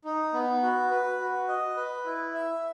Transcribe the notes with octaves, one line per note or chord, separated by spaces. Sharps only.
D#4
B3
F#4
B4
F#4
D#5
B4
E4
E5